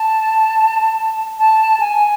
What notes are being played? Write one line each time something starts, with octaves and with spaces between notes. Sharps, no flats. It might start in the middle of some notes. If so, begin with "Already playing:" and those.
Already playing: A5
A5
G#5